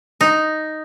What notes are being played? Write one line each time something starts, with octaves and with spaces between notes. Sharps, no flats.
D#4